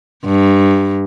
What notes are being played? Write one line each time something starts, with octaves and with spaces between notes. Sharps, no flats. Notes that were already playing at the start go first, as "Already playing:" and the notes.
G2